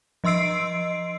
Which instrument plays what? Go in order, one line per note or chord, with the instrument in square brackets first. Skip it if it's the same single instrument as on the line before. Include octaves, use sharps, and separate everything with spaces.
[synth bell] F3 D#5 C6 E6 C7 D7